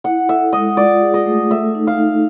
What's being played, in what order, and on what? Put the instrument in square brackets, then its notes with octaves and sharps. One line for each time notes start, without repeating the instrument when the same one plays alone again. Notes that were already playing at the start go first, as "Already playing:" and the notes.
[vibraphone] E4 [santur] F#5
[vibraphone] A4 [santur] E5
[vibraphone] G#3 [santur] D#5
[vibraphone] F4 [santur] D5
[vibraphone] G#4
[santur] D#5
[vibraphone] A3
[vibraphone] A4 [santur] E5
[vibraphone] D#4
[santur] F5
[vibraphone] D#4